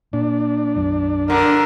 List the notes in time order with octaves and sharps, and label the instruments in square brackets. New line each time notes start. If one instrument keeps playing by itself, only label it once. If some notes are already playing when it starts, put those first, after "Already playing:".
[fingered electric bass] A#2 [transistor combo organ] D4
[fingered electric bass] B1 F#2
[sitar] D3 [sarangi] A#4